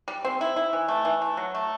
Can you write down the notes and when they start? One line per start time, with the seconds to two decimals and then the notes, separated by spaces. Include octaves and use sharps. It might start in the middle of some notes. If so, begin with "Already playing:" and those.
0.08 G3
0.25 C4
0.41 E4
0.56 E4
0.73 E3
0.88 A3
1.05 E3
1.22 A3
1.37 F#3
1.55 A3